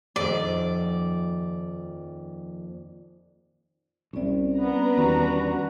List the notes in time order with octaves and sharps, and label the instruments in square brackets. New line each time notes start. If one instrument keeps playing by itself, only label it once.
[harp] D#1 F2 [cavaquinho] D5
[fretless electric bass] C2 C3 [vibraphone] C#4 D5
[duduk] B3 [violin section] D4 B4 A#5
[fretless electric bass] E2 D#3 G3 [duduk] F#4